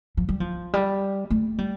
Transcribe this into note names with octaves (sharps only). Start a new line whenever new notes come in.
F3
G3
F3
G3
A3
G3